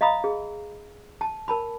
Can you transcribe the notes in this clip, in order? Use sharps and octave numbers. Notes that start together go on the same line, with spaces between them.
D#5 F5 A#5 B5 D#6
G#4
A5
A#4 A5 B5